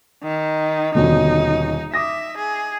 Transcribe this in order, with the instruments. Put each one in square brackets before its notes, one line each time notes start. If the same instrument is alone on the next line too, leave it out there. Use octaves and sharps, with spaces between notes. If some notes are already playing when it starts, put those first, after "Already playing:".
[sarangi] D#3
[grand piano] D#1 B2 D3 [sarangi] D#4
[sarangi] E5 [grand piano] D6 D#6 A#6
[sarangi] G#4